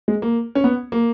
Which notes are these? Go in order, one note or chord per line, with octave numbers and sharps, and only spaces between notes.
G#3
A#3
C#4
B3
A#3